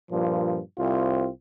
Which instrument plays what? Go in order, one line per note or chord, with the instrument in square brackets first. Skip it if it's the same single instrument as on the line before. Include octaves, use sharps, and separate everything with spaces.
[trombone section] G2 A#2 F3
C2 C4 F4